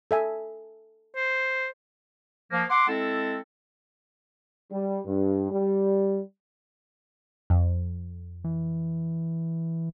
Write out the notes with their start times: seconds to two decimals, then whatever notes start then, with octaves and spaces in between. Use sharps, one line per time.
0.11 A4 E5 G#5
1.15 C5
2.51 F3 A#3
2.70 F#5 C6 D6
2.87 G#3 C4 E4 A4
4.70 G3
5.05 G2
5.51 G3
7.50 F2
8.44 E3